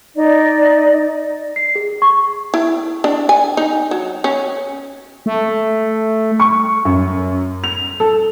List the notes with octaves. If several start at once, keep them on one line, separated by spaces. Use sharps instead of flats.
D#4 D5
C7
G#4
C#6
E4
D4
G#5
D#4
F#3
C#4
A3
C#6
F#2
F7
A4